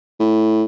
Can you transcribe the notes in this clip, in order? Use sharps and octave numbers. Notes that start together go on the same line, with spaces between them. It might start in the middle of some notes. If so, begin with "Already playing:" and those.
A2